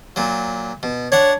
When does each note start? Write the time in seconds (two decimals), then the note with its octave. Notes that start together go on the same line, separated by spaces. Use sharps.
0.16 A#2 F#3
0.83 B2
1.12 D4 C#5 F#5